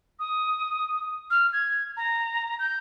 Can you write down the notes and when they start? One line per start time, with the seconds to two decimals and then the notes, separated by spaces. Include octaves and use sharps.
0.19 D#6
1.31 F6
1.53 G#6
1.97 A#5
2.59 G6